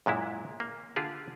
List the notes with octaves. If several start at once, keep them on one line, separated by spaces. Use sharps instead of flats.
F#2 A#2 G#3 E4
A#3
D3 F4 G4 G#4